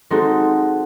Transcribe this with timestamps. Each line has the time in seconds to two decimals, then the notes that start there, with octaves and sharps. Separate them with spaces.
0.10 G#3 C4 D#4 F#4 A4